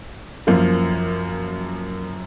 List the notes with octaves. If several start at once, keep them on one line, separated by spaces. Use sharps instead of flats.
F#2 F3 A#3 F4